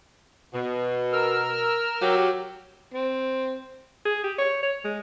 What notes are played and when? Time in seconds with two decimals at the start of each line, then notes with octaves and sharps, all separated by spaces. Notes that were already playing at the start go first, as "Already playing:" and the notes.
0.53 B2
1.13 A#4 E6 F6
2.01 F#3 G4
2.94 C4
4.05 G#4
4.24 G4
4.38 C#5
4.63 C#5
4.84 G#3